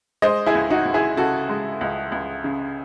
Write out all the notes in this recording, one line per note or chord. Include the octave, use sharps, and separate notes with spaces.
G#3 C5 D#5
E4 G#4
C#2
D#4 F#4
C#2
E4 G#4
C#3 F#4 A4
G#3
C#2
C#2
C#3